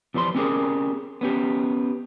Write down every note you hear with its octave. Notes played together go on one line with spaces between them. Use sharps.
F2 E3 G3 C4 C6
C4 C#4 G4 G#4 A#4
B3 C#4 G4